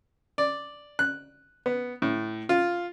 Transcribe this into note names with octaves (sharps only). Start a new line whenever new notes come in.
D5
F#6
B3
A2
F4